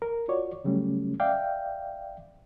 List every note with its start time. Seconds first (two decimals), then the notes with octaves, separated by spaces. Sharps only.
0.02 A#4
0.28 F4 F#4 C#5 D5
0.64 C#3 F#3 G3 A3 C#4
1.20 D5 E5 F5 G5